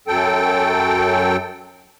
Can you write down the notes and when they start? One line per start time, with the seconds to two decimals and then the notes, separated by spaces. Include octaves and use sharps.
0.08 F#2 F#3 A4 G5